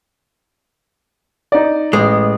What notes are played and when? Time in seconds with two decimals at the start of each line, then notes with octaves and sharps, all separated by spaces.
1.52 D#4 D5
1.93 A1 G#3